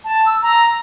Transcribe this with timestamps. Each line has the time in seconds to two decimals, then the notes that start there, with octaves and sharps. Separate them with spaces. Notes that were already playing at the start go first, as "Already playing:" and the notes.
0.04 A5
0.26 E6
0.42 A#5